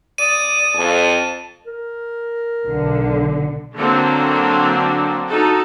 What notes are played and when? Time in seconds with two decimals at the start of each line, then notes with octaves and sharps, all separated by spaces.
0.18 D5 D#6 D#7
0.76 F2 A5
1.66 A#4
2.66 B1 D3
3.76 D3 F#3 A#3 C4 D4 A4
5.28 D#4 F#4 A4